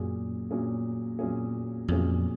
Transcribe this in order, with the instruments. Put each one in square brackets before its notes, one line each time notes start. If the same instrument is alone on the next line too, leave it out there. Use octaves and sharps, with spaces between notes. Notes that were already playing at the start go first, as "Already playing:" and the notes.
Already playing: [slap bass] F#2 [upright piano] A#2 F#3 C#4 G#4
[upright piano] A#2 F#3 C#4 G#4
A#2 F#3 C#4 G#4
[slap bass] F2 [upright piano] A#2 F#3 C#4 G#4